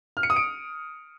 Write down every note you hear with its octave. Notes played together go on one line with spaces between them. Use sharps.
F6
C#7
D#6
D7